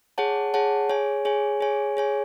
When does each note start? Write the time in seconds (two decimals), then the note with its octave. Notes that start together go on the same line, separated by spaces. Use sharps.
0.18 G#4 C#5 F#5 A5
0.54 G#4 C#5 F#5 A5
0.89 G#4 C#5 G#5
1.25 G#4 C#5 G#5
1.61 G#4 C#5 G#5
1.97 G#4 C#5 G#5